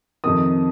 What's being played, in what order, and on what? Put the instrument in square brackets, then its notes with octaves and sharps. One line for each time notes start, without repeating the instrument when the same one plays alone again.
[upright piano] F2 C3 D#3 D#6